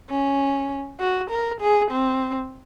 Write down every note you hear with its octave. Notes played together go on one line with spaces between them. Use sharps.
C#4
F#4
A#4
G#4
C4